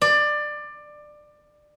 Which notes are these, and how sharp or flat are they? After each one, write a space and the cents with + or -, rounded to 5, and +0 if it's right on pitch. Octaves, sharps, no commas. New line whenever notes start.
D5 +20